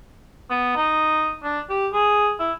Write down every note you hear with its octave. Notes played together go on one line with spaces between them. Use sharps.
B3
D#4
D4
G4
G#4
E4